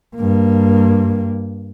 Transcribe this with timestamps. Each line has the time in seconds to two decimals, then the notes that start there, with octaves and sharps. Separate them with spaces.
0.16 G2 A#3